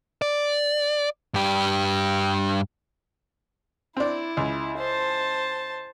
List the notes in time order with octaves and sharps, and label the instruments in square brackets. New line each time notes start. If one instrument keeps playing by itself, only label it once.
[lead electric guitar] D5
G2 G4
[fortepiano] C4 D4 [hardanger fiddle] E4
[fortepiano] C#2
[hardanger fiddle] C5 A5